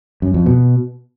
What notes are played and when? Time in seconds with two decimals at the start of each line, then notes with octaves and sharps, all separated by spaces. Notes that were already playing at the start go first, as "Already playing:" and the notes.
0.22 F#2
0.34 F2
0.46 B2